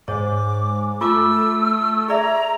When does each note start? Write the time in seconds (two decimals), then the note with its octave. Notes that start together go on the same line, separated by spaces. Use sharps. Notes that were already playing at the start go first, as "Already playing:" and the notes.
0.08 G#2 C#5 D6
1.01 A3 F4 D6 E6
2.08 G#4 D5 E5 A#5